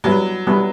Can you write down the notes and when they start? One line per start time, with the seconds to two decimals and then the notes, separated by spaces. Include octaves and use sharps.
0.04 F#3 G3 B3 E4 B4
0.47 G3 B3 E4 B4